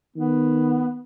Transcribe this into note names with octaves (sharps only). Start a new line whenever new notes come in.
D#3 B3